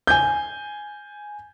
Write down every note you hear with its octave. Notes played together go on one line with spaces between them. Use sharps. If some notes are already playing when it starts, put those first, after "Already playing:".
G#5 G6